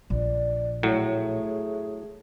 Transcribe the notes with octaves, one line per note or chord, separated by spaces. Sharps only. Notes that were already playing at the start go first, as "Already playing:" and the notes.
A#1 D5
A2 F#3 A3 G#4